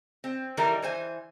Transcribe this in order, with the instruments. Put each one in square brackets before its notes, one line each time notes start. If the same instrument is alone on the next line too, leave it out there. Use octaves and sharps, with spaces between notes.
[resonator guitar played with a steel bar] C4
D#3 E3 G3 A4 A#4
E3 C5 G#5